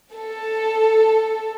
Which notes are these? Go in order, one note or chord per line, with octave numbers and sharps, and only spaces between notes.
A4